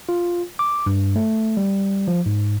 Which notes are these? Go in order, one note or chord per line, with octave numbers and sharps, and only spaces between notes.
F4
D6
G2
A3
G3
F3
G#2